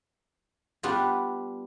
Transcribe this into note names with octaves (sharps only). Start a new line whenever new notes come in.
G3 B3 D4 F4 D5